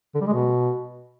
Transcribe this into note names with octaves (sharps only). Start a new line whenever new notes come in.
D3
G3
G#3
B2